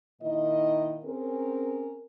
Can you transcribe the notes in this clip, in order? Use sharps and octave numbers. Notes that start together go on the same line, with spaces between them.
A#2 D#3 E4 D#5
C4 C#4 G#4 A#4